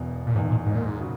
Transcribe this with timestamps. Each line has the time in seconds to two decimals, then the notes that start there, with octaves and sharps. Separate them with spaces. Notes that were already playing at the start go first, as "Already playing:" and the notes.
Already playing: E1 E2 B2
0.27 A#2
0.35 E1 E2 G#2 D#3
0.50 A#2
0.66 G#2
0.75 A#2
0.85 G#2
1.00 C#3 F#3